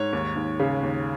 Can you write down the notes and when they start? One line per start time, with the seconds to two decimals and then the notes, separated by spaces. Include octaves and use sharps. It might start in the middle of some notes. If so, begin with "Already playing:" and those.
Already playing: G#2 C#5
0.13 D#2
0.36 D#2
0.60 C#3
0.82 D#2